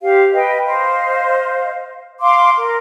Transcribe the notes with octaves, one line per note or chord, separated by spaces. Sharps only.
G4 C5 F5
B4 D#5 G5
C5 D#5 F5
F5 C6 D6
A#4